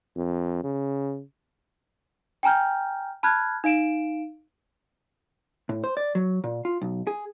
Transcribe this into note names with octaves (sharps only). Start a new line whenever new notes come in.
F2
C#3
G5 G#5 A#5 F6 G6
A5 B5 F6 F#6 G#6
D#4 F5 D7 E7
A2
C5
D5
F#3
A#2
F4
B1
G#4